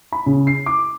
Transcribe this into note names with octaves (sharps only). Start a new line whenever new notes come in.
B5
C#3
C7
D6